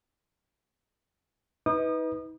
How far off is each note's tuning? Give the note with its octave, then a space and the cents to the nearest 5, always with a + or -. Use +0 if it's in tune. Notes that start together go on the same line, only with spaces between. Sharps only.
D#4 +40 B4 +0 D#6 -30